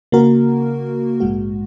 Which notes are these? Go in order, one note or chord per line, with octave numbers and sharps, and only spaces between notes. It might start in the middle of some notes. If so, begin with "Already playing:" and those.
C#3 A#3 F#4 A#4
A#1 G#2 G#3 F#4